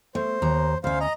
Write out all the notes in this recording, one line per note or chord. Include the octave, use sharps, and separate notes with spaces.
A3 C5
D#2 A#5
D2 C#4 C5 F5
D#5 A#5